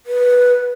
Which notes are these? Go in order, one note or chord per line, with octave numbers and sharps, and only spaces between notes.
B4